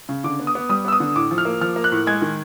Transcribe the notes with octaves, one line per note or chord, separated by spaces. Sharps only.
C#3
D3 D6
B3
D#6
B3
G3 D#6
B3 E6
D#6
D3
A2 D6
F3
F6
A#3
F3 F6
A#3
F#6
A2
G#3 G#6
D#3